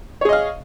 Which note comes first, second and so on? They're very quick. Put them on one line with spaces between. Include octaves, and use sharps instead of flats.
C#5 G#4 D#5 F5